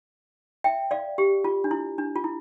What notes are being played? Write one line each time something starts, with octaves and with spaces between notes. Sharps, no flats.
E5 G5
D5 F5
G4
F4
D4
E4
D4
F4
E4